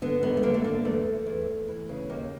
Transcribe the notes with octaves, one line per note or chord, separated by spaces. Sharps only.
D3 B3
D#2 B3
A3
D3 A#3
A3
D3 A#3
E2 A3
E2
E2
E2
E3
C#3
D#2 A#3